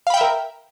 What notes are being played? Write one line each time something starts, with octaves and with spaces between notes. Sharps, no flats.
A#4 E5 F5 G5 B5